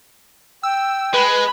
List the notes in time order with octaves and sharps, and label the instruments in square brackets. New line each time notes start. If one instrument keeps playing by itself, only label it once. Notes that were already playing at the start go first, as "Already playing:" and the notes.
[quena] G5 [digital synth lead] E6
[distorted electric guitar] G#3 [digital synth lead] B4 [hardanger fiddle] B5